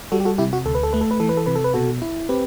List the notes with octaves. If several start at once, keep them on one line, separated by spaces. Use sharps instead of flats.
G3 F#4 A4
G4
F#4 A4
C3 E4 G4
F#4
D2 A4
B4
A4
A3 B4
A4
B4
E3 A4
B4
A4
C3 B4
A4
B4
B2 F#4 A4
E4
C4 G4 B4